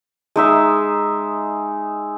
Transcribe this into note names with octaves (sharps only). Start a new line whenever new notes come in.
G#3 D#4 E5